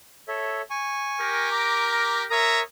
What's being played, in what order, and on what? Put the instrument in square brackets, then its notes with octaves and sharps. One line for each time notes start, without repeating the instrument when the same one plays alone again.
[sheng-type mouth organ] A4 C#5 E5
G#5 C#6
[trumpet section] G4 A#4
[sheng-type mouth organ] A#5 D6
[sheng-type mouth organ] A#4 D#6 [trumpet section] C#5 E5 A#5